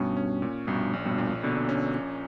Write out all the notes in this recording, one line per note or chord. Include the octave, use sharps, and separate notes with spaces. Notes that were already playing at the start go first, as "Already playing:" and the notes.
Already playing: G2 B2 C#4
C#4
A#2
A#1 G2 B2
A#1
G2 B2
A#2
A#1 B2 D3
C#4
C#4